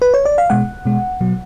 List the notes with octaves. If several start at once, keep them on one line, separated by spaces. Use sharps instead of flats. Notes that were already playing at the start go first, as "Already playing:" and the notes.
B4
C#5
D5
F5
B2 G#3 F#5
B2 G#3
B2 F#3